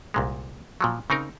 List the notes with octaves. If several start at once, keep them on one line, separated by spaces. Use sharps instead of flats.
C2 A#2 G#3
A#2 F3 F#3
C#3 C4 D#4 A#4